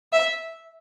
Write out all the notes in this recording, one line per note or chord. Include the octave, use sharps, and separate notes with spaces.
E5